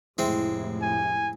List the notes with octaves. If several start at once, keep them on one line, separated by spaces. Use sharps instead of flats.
F1 A2 G#3 C4 E4
G#5